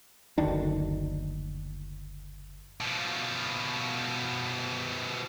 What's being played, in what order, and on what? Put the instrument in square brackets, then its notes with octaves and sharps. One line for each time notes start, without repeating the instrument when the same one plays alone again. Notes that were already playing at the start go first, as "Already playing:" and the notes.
[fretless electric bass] F#1 D2 D#3 D4
[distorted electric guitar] B2 F3